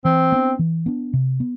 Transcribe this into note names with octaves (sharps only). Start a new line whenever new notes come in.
E3 C4
B3 D4
E3
B3 D4
C3
B3